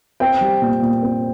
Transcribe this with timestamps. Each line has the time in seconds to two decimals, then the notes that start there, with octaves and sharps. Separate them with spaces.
0.20 C4 G5
0.41 G3
0.62 A#2
0.82 A#2
1.03 C4